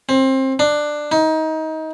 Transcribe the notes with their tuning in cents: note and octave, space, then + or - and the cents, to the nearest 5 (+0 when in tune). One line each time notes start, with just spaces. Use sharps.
C4 +25
D4 +15
D#4 +25